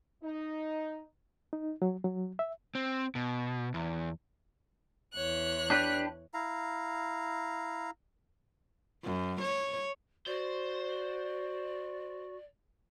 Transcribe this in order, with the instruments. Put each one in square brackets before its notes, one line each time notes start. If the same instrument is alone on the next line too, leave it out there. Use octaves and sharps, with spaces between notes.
[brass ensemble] D#4
[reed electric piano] D#4
F#3
F#3
E5
[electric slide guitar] C4
B2
E2
[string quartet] E2 C#5 F#6
[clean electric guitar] D4 G4 B4
[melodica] E4 F5 A#5
[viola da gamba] F#2
C#5
[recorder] F#4 [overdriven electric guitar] C5 [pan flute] D5